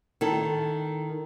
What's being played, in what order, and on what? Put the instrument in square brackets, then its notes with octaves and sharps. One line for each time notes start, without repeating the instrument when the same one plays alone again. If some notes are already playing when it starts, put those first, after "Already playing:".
[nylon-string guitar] D#3 E4 A4